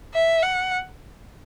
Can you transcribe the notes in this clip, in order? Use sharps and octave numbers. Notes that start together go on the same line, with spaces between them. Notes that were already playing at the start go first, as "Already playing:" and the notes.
E5
F#5